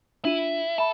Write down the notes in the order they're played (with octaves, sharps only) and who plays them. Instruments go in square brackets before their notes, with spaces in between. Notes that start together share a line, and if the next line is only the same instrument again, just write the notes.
[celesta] D4 F4 D#7 [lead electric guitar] E4
[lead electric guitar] A4 [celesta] E5 A5 B5